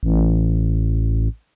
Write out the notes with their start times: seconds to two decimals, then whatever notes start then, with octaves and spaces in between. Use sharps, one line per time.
0.03 A1